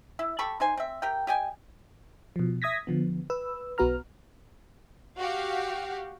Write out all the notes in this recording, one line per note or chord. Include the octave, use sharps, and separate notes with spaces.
E4 E5
G4 A4 B5 C#6
D#4 C5 G#5
C4 E5
G4 A#4 G5
G4 D#5 G5 G#5
B2 F3
E5 D#6 G#6 A#6 B6
D3 F3 B3
B4 E6
B1 B3 F#4 B4 A#5 F6
F#4 G4 F5